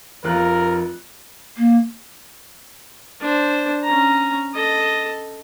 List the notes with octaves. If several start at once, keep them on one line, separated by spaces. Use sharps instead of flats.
F1 F4 A#4 F#6
A#3
D4 C5
C#4 A#5
A4 D#5